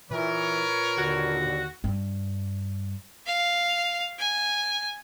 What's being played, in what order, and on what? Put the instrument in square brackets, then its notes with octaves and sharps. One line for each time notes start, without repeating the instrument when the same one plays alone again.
[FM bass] A#2 [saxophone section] E3 [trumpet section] A#4 B4 C#5
[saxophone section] D#2 D3 [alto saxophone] F#4
[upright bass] G2
[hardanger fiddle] F5
G#5